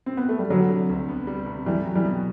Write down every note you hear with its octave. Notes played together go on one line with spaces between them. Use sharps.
C4
B3
A3
G3
D3 F#3 G3
C3
D2
B3
G3
C3
E3 G3 A3
F#3
E3 G3
B2